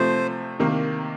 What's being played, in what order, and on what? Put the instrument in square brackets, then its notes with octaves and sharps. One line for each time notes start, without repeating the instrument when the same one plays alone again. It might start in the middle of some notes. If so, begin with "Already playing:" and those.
Already playing: [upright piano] C3 F3 A3 [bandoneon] C5
[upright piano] C3 D#3 A#3